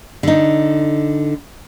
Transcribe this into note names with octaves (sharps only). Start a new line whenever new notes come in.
D3 D#4